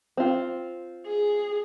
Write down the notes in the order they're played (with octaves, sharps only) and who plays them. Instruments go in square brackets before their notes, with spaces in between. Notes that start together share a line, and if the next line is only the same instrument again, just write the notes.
[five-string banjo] C4 F4
[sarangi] G#4